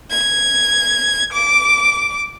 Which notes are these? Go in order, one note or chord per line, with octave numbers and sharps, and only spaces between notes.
G#6
D6